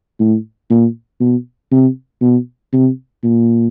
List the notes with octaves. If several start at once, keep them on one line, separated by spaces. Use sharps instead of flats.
A2
A#2
B2
C3
B2
C3
A#2